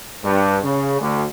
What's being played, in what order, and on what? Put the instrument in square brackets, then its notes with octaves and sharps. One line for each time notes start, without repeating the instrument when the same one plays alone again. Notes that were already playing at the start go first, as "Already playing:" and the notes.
[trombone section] G2
C#3
D2